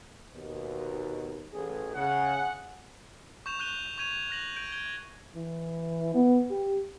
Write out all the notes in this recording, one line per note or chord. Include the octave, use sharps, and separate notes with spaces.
D#2 B2
A1 G#4
C#3 G#4 F#5
C#6 G6 E7 F7
C#6 F#6 G6 D#7 F7 G7
C#6 G6 G#6 D#7 F7
F#6 A#6 F#7
G6 G#6 D7
G#6 D7 G7
E3
B3
G4